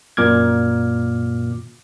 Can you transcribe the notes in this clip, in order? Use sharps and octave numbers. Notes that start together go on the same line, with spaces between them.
F#2 A#2 D6 F6 G#6